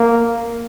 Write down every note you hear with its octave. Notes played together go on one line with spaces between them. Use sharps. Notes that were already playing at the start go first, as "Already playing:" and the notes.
Already playing: A#3